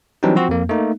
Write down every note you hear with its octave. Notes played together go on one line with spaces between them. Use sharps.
E3 F#3 G3 C4 D4 D#4
F3 C4 F#4
F2 A#3
A3 A#3 D#4